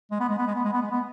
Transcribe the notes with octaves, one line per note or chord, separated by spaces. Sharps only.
G#3
B3
G#3
B3
G#3
B3
G#3
B3
G#3
B3